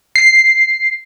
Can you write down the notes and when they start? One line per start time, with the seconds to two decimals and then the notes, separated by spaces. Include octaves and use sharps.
0.16 C7